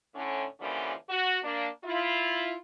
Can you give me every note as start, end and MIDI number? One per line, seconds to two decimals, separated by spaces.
0.15 0.44 45
0.15 0.44 50
0.15 0.44 61
0.60 0.93 50
0.60 0.93 52
0.60 0.93 53
0.60 0.93 55
0.60 0.93 58
0.60 0.93 61
1.10 1.38 66
1.43 1.68 58
1.43 1.68 62
1.84 2.55 64
1.84 2.55 65